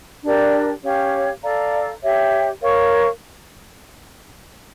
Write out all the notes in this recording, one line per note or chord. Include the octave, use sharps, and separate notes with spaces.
D4 G4 A#4 D5
C#4 G4 C#5 F5
A4 D5 F5 A#5
G4 C#5 E5
A#4 C#5 F5 C#6